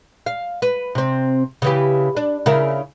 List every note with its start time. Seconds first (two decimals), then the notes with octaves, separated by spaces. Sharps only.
0.26 F5
0.62 B4
0.95 C3 C4
1.62 C#3 E3 G4
2.17 D4
2.46 C#3 E4 A#4